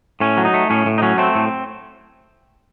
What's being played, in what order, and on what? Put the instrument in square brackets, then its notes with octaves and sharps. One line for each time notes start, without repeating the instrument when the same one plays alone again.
[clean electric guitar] A2 C#4
F#3
D#4
A3
A2 C#4
A2
D#4
F#3 C#4
A3 C4
A2